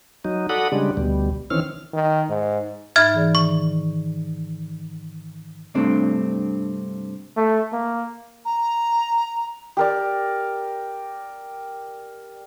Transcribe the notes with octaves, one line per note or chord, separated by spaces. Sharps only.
F#3 D#4
F#4 A4 D5 F#5 B5 D#6
C#3 G3 G#3 D4
D2 B2 G3
D#3 E3 C4 C#4 F6
D#3
G#2
G#2 D#4 E5 B5 F6 G#6
E3 G#4 D5
D#3 C#6
G2 C3 A3 C4 D4
A3
A#3
A#5
G4 A#4 D5